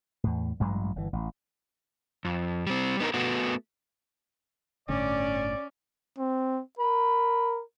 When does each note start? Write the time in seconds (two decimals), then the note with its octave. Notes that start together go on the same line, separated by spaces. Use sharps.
0.24 E2 A2
0.60 A1 G2 F#3 G#3
0.96 G1 E3
1.13 A1
2.25 F2
2.67 G3 C4
3.00 B3 D#4 A#4
3.14 A3 B3 F#4
4.89 G1 A2 D3 C#4 D5
6.18 C4
6.79 A#4 B5